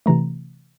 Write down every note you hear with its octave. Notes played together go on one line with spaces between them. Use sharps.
C3 E3 A3 A#5